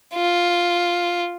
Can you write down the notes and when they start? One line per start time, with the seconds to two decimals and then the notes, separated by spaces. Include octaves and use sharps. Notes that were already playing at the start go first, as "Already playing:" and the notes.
0.15 F4